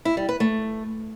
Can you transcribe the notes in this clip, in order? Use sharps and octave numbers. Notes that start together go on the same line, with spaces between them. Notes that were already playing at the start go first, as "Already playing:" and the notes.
E4
G3
B4
A3